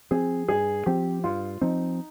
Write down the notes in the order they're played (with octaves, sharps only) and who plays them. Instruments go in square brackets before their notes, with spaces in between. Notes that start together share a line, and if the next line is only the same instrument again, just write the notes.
[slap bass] F3 C4 [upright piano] G#4
[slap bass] G2 [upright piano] G#4
[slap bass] F3 C4 [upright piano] G4
[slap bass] G2 [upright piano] F4
[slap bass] F3 C4 [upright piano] D#4